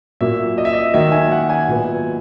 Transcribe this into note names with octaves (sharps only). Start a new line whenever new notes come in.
A#2 F#3 A#3 E5
D#5
E5
D#5
D#3 F#3 A#3 E5
G#5
F#5
G#5
A#2 F#3 B3